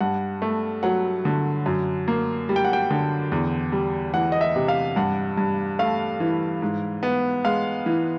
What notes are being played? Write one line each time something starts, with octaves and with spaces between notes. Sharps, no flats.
G2 F#5
A3
F#3 F#5
D3
F#2
A#3
G3
G5
F#5
G5
D3
E2
G3
E3 F#5
D#5
E5
C3
F5
G2 F#5
G2
A3 F5
E3
G#2
B3
G#3 F5
E3